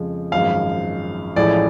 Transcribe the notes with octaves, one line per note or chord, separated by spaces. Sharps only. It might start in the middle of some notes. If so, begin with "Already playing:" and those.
Already playing: F2 C#3 F3 G#3
G#1 F#2 F3 G#3 F5
A1 A2 F3 G#3 D5